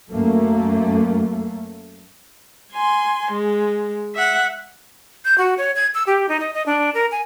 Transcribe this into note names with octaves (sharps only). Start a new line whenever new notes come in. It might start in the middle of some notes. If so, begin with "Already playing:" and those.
F#2 A3 A#3
G#5 C6
G#3
E5 F#5
G6
F#4
C#5
G#6
E6
G4
D#4
D#5
D#5
D4
A#4
G#5